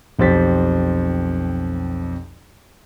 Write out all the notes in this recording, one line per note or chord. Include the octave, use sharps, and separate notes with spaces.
B1 F2 G4 C5 A6 B6